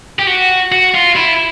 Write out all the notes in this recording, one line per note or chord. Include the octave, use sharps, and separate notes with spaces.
G4
F#4
F#4
F4
E4